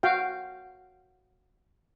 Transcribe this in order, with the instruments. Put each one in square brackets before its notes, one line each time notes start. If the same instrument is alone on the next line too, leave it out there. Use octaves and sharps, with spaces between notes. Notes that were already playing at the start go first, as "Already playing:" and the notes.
[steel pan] F#4 F5 G5